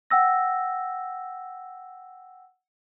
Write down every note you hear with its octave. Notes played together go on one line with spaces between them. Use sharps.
F#5 G5 E6 A#6